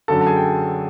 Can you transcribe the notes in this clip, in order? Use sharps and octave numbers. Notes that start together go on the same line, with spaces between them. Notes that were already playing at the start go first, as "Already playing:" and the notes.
F#2 D3 F#3 A4 A5
A5
G#4 G#5
G5